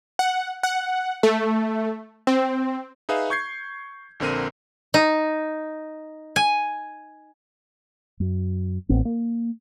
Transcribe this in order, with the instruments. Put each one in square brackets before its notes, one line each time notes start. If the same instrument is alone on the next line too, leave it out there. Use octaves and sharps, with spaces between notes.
[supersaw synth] F#5
F#5
A3
C4
[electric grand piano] D#4 G#4 B4 E5 F5
C#6 G6 G#6 C7
A#1 D3 C4 A#4 D#7
[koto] D#4
G#5
[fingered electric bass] F#2
A1 B3 C4
A#3